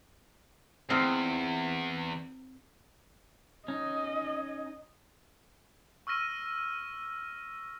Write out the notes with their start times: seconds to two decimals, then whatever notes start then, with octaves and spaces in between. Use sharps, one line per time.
0.90 E2 C4 D#4 F4
3.68 C#4 D#4 D#5
6.07 C#6 E6 F6 A#6 D#7